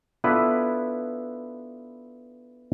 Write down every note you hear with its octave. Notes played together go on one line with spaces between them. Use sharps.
B3 D4 E4 F4 A4 B4